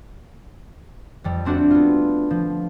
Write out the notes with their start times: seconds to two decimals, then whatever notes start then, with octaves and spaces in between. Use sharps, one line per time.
1.24 F2 G3
1.45 A3 C4 D4 F#4 A4
1.71 B3 F4
2.31 F3